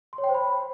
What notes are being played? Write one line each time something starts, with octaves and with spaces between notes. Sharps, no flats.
C6
C#5
G5
C5
B5